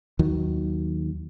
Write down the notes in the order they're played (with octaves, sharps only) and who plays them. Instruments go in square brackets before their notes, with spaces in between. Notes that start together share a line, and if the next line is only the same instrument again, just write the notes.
[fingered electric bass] D#2 D#3 F#3